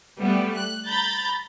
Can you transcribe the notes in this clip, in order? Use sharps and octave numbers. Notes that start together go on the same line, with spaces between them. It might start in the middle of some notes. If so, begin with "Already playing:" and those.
G3 A3 B3
F#6
A#5 B5 G6 A6